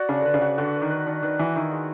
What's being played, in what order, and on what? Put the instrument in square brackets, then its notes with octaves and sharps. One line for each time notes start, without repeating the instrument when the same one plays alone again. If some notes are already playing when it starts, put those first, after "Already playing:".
Already playing: [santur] F#4 D5
[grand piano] C#3 [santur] D4
[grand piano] D3 [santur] B4
[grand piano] C#3
[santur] F#4
[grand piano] D3 [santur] F#4
[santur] B4
[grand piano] D#3
[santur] B4
[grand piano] D#3 [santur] D4
[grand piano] D#3 [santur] B4
[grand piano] E3 [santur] F#4
[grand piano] D#3 [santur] E4
[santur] G#3